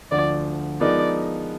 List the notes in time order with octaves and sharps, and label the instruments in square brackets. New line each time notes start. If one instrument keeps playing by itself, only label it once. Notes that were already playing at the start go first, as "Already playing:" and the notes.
[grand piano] D2 D3 F3 [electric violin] D5
[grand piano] F3 G#3 B3 D#4 A#4 [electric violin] D5